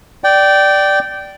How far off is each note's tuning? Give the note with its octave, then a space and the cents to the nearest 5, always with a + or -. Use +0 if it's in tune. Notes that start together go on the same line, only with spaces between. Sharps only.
D5 +0 G5 -15